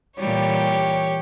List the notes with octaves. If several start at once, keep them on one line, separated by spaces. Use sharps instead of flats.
A#2 E3 G3 G4 C#5